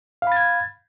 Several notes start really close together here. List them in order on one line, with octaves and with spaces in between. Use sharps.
F5 B5 A6 G#6